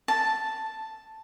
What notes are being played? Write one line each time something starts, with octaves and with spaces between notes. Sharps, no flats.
A5